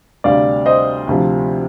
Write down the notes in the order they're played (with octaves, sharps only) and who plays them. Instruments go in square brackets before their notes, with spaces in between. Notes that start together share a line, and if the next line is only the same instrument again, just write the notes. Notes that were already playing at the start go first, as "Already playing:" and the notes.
[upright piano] D2 C3 G3 D5 F5
C5 D#5
D2 C3 F3